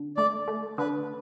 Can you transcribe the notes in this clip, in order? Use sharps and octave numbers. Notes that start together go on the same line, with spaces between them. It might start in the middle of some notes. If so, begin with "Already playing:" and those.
Already playing: D3
A3 D5
A3
D3 B4